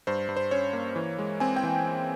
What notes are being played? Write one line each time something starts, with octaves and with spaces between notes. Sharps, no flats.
G2 C5
G2
C5
C#4 C#5
A#3
E3
G#3
C4 G#5
G5
E3